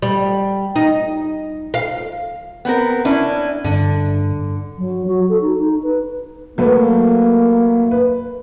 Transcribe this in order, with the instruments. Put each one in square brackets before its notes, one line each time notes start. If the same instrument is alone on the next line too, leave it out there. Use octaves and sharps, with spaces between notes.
[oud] G3
D#4
F5
[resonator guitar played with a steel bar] B3 C4 A#4
C#4 D4 E4
[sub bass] G2 [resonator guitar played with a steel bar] D3
[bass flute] F#3
F#4
A4
D#4
D#4
B4
[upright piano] F#3 A3 B4 [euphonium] A#3
[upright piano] B4